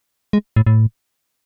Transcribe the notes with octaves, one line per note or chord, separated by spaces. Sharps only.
G#3
A2
A2